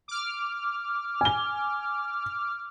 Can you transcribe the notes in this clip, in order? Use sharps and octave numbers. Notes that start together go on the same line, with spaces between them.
D6 F6
G#5 G7